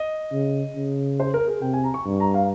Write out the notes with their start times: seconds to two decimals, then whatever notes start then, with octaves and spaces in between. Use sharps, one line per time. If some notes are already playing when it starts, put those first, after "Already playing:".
Already playing: D#5
0.32 C#3
0.76 C#3
1.20 C5
1.34 A#4
1.47 G#4
1.62 C3 G5
1.73 G#5
1.84 A#5
1.94 C#6
2.06 G2
2.20 A#5
2.34 F5